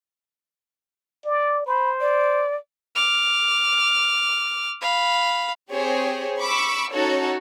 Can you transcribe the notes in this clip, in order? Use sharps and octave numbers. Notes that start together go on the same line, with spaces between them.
D5
C5 B5
D5
D6 F6
F5 B5
C4 G4 G#4 C5 C#5
B5 C#6 D6 E6
C#4 D#4 F#4 A4 C#5